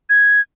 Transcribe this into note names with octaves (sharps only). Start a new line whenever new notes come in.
G#6